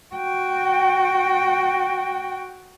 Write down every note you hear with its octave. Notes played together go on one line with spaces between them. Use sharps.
F#4 G5